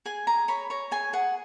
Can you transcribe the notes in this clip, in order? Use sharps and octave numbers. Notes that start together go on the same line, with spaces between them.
G#4 G#5
G#4 A#5
C#5 B5
C#5 A#5
G#4 G#5
G#4 F#5